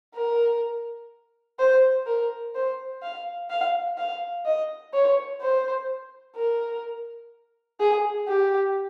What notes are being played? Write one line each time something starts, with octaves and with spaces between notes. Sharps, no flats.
A#4
C5
A#4
C5
F5
F5
F5
D#5
C#5
C5
A#4
G#4
G4